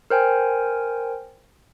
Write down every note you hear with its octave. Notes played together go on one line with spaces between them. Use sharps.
A#4 C5 G5 G#5